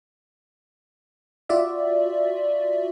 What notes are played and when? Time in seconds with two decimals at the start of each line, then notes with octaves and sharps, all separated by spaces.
1.49 F4 F#4 D5 E5